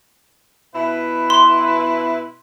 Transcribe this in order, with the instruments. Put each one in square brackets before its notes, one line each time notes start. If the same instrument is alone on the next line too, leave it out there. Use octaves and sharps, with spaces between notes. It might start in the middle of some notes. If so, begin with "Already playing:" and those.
[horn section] B2 E4 B4
[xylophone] C6